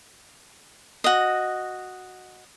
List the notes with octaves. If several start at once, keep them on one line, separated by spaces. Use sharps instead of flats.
F#4 D#5